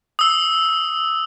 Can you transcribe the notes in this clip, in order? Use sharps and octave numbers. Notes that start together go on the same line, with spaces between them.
D#6 E6